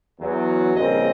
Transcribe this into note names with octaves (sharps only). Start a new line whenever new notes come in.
E2 F#3
A#1 G2 C#3 A#3 C4 D#5